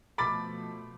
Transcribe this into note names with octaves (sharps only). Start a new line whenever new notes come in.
B2 F3 A3 B5 D6 A6